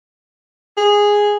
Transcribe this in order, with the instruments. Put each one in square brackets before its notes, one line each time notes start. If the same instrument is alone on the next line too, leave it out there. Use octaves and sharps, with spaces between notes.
[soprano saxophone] G#4